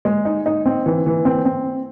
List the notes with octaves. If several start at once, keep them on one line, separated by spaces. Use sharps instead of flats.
G#3
D#4
D#4
C4
E3
E3
C4
C4